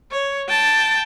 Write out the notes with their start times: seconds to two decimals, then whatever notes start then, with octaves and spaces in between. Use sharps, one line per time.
0.12 C#5
0.49 G5 A5